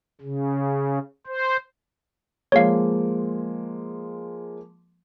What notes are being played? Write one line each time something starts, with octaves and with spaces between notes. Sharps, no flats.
C#3
C5
F3 G#3 A#3 C#5 F5